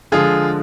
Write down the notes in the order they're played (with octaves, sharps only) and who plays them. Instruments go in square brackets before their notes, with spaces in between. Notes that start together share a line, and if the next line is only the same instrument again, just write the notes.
[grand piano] D3 F3 G#3 F4 G#4